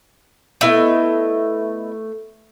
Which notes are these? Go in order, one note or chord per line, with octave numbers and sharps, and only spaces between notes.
A3 B3 E4 D#5